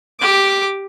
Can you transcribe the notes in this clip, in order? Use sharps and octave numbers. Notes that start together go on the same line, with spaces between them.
G4 D6